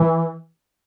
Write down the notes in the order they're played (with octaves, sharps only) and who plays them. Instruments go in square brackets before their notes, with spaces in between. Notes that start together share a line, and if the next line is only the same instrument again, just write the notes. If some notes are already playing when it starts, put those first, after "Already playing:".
Already playing: [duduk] E3